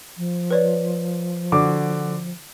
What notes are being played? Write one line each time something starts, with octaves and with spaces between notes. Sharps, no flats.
F3
B4 C#5 D5
D3 F#4 D6